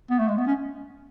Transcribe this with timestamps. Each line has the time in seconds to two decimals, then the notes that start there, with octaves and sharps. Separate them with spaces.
0.10 B3
0.19 A3
0.28 G#3
0.38 B3
0.47 C#4